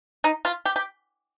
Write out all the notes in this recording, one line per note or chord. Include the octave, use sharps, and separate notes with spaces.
D#4
F4
G4
G4